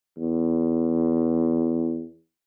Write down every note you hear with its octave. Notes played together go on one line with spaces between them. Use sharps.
E2